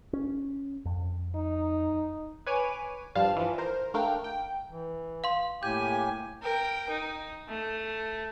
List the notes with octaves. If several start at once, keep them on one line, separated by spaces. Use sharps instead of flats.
C#4
F2
D#4
B4 C#5 G#5 D6 D#7
G2 F3 G3 F5 A5 E7
E3 F3
A#4 C5
A3 D4 A#4 F5 G5
G5
E3
F5 C6
A2 A#3 G4 G#5 G6
A#4 G5
D#4
A3